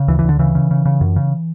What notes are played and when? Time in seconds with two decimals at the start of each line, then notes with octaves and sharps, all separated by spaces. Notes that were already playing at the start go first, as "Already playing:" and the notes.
Already playing: C#3
0.08 D2 E3
0.19 E3
0.24 D2 D3
0.39 C#3 E3
0.55 C#3
0.71 C#3
0.85 C#3
1.01 F#2
1.16 C#3